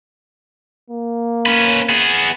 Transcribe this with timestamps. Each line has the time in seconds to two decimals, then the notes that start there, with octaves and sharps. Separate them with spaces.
0.90 A#3
1.46 C#4 B4
1.89 B3 G#4